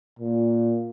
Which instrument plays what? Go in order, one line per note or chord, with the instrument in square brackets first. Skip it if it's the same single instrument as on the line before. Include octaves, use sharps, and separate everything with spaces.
[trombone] A#2